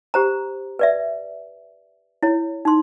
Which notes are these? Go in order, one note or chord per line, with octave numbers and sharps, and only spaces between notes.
G4 C5 A#5
B4 D5 E5
E4 C#5
D#4 C6